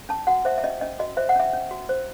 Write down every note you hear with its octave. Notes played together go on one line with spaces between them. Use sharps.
C#4 A5
F#4 F#5
C5 E5
E5
C#4 D#5
C#4 D#5
F#4 D#5
C5 E5
F#5
C#4 E5
C#4
F#4
C5